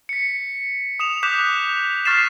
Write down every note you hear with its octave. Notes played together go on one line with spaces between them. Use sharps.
B6 C#7
D#6 E7 F7
D6 D#6 F#6 G6 B6 E7
C#6 F6 A6 B6 C7 E7